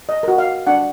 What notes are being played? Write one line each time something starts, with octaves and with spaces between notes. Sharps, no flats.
D#5
F#4 A#4
F5
D4 F#5